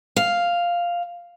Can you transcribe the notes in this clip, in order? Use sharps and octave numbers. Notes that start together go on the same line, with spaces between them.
F5